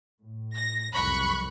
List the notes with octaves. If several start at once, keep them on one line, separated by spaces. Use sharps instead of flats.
A2
A#6
F#1 C2 F2 B5 C#6 F#6